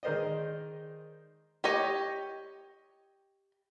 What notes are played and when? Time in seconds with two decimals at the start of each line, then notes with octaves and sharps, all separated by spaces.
0.03 D#3 G#3 A#4 C5 D5 D#5
1.64 G4 C#5 D#5